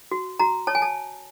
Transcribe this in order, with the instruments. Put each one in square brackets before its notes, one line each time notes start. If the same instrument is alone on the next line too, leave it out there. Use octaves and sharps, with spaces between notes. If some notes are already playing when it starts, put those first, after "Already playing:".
[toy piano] F#4
F#4 A#5
C#5 A5
G#5
A5